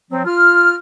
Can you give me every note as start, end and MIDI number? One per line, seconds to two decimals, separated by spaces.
0.11 0.25 53
0.11 0.25 54
0.11 0.25 60
0.26 0.75 65
0.26 0.75 89